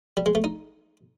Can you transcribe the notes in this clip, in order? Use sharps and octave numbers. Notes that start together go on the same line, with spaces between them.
G3
G#3
A3
D#4